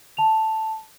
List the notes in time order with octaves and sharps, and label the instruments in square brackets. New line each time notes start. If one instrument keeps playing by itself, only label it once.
[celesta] A5 F7